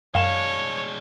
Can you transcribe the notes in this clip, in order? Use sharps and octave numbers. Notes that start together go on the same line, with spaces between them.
F#2 G#3 D4 C#5 F5 E7